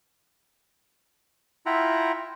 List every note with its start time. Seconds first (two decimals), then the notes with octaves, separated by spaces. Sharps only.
1.66 E4 F4 E5 F#5 G5 A#5